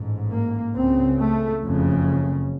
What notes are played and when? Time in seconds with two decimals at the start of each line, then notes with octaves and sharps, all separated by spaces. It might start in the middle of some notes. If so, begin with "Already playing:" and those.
Already playing: A1 G#2
0.31 A#3
0.75 C#2 C#3 C4
1.19 A3
1.62 F#1 F2 C#3